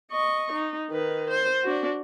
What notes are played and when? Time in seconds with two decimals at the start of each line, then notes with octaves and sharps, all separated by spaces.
0.12 D#5 C#6
0.52 D#4
0.90 D#3 B4
1.30 C5
1.64 D4 F#4